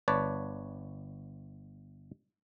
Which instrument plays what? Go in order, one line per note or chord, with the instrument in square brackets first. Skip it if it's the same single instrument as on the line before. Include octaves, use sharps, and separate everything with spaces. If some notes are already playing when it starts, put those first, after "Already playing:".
[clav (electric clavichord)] G1 B4 C#5 D5 A5